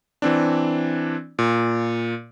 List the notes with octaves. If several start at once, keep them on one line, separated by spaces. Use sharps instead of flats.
E3 C4 D4
A#2